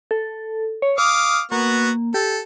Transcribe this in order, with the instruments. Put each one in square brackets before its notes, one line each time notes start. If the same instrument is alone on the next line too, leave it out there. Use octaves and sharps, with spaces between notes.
[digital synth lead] A4
C#5
[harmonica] F5 D6 D#6 [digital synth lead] F6
[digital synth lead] A#3 [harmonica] B3 F#4
[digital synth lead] G4 [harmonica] A4